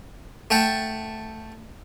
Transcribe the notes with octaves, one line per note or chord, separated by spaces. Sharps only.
A3 F#5 G5 A5